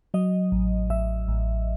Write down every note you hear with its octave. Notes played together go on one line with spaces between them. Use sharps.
F#3 D#5
A1
A1 E5
A1